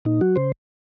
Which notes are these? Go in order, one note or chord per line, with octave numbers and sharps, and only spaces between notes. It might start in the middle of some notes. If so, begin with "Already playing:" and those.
A#2 D#4
F#3 F#4
C#3 C5